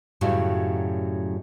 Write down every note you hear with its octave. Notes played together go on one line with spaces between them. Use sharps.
F#2 A2 C#3 F#3 G3